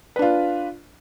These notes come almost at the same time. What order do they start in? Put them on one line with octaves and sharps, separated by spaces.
B4 D4 F4